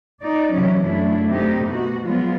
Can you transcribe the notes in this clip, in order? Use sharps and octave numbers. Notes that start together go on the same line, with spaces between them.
D#4 D5
C3 E3 F#3 C#4
F#2 A3 D4 E4
C3 A3 D#4 G4
B2 F#4
F3 F#3 G#3 B3 F4